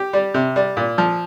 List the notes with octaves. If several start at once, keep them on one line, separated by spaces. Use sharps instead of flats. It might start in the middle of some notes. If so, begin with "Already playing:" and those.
Already playing: G4
G3
C3
G3
A#2
F3